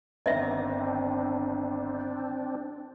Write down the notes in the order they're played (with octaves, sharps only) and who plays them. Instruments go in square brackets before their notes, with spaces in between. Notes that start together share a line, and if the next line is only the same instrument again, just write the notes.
[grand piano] G1 D#3 [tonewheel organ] C4 D4 [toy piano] D#5 E5